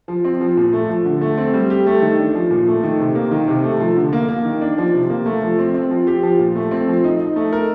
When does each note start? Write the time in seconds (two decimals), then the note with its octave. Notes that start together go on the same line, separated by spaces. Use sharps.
0.08 F3
0.24 C4
0.41 F3
0.57 A#2
0.73 A3
0.89 F3
1.05 D3
1.21 A3
1.38 C4
1.54 G3
1.70 G4
1.87 A3
2.02 D#3
2.18 D4
2.35 F3
2.51 A#2
2.67 A3
2.83 D#3
2.99 C3
3.15 A#3
3.32 D#3
3.48 C3
3.64 A3
3.80 F3
3.96 D3
4.13 A#3
4.29 A#3
4.45 D#3
4.61 D4
4.78 F3
4.94 C3
5.10 A#3
5.26 A3
5.42 F3
5.59 C4
5.74 C4
5.90 F3
6.07 G4
6.23 F3
6.39 A#2
6.56 A3
6.71 C4
6.88 F3
7.04 D#4
7.20 D#4
7.36 A3
7.53 A#4